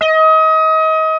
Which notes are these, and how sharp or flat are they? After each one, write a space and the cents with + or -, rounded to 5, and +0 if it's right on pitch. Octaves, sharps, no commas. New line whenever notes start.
D#5 +30